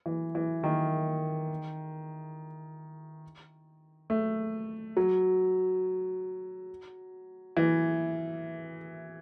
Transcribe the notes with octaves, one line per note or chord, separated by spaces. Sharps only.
E3
E3
D#3
A3
F#3
E3